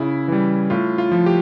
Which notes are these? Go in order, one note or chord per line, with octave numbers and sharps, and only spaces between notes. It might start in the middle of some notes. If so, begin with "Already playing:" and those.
Already playing: C#3 E4
E3 G3
A2 F4
F4
F3
G4